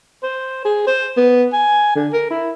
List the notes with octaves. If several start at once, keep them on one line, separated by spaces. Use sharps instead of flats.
C5
G#4
C5
B3
G#5
D3
A#4
E4